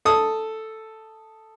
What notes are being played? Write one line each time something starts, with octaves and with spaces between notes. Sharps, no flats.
A4 D#6